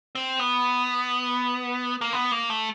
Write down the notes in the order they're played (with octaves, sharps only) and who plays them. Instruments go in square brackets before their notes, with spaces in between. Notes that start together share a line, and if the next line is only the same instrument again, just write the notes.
[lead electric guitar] C4
B3
A#3
B3
A#3
A3